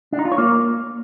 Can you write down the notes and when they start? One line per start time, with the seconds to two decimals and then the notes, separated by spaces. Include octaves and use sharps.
0.13 D4
0.19 D#4
0.25 F4
0.32 C#5
0.38 A#3